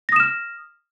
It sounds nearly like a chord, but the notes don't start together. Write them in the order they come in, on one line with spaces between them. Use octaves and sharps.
A#6 D#6 E7 F6